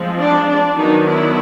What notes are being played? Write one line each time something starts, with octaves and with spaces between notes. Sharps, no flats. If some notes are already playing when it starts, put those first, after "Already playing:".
Already playing: F3 G#3 C4
D4
D4
D#3 F#3 B3 D4 D#4
E4